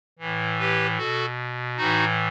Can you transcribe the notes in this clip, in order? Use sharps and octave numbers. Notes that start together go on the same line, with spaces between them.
A2 E3
G4 B4
B2 F#4 A4
A2 E3 D#4 F#4